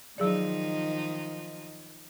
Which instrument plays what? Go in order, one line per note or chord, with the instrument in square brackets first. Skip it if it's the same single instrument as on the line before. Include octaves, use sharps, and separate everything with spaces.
[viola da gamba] D#3 F3 D#4 [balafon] F#3 G#4 D5